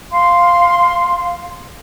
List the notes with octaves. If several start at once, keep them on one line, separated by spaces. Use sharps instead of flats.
F5 C6